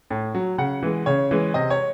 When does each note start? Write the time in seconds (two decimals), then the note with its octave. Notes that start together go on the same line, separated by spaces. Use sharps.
0.10 A2
0.35 F#3
0.58 C#3 F#5
0.83 E3 G#3
1.06 C#3 C#5
1.31 E3 G#3
1.54 C3 D#5
1.70 C#5